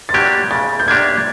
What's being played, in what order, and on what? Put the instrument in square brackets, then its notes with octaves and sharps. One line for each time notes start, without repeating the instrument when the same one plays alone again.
[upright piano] A6
[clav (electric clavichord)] F#3 A#3 D4 G4 [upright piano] G#6
[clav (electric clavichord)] C#3 [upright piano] A6
[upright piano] G6
[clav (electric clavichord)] F#3 A#3 D4 G4 [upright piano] G#6